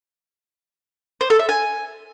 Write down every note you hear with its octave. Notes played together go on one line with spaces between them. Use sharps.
C5
A4
E5
G#5